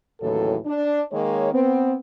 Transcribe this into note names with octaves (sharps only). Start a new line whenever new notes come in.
D#2 A2 C#3 E3 F#3 A4
D4
D#3 G#3 A#3 C#5
B3 C4